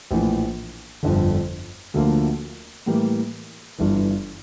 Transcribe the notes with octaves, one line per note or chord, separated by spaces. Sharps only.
A#1 A2 E3
G1 F2 D3
D2 D3 F3 A#3 F4
A2 E3 G3 A#3
G1 G2 E3